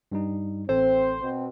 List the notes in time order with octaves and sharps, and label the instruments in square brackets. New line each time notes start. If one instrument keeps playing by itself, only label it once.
[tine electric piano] G2 G3 D#4
[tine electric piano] A1 A4 [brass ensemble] C4 [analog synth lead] C5
[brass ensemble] B2 C4